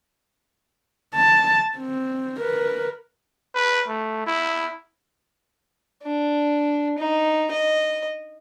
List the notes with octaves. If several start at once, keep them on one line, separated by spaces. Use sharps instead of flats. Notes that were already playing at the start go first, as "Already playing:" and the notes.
A5
C4
A#4 B4
B4
A3
E4
D4
D#4
D#5